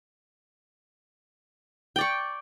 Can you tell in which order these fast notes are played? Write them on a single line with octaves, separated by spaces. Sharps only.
G5 D5 C#6